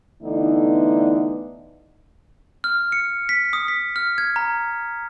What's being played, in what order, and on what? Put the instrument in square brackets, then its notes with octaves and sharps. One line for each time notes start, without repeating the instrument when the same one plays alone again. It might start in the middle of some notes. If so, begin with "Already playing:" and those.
[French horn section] D3 E3 A3 B3 D4 D#4
[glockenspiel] F6
C#7
B6
D#6
B6
F6
G#6
A#5